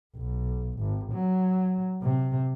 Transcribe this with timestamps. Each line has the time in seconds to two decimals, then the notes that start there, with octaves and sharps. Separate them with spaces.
0.16 B1
0.79 G#1
1.13 F#3
2.02 C3